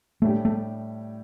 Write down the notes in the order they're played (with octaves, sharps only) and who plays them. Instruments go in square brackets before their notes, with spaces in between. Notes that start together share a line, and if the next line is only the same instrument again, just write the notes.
[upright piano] A2 G3 D4 G4 [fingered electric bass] A3
[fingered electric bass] A3